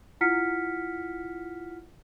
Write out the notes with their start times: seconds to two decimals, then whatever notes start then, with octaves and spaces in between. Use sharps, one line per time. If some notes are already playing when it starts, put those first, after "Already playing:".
0.21 E4 F4 F#5 F6 B6 C#7